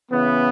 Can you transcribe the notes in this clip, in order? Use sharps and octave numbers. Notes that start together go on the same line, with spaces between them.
C#3 E3 B3